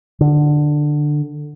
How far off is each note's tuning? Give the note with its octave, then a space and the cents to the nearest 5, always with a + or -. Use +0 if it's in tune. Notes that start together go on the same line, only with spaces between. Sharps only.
D3 +15